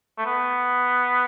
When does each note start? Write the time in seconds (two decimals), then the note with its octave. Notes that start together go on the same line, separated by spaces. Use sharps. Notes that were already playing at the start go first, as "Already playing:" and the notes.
0.18 A3
0.26 B3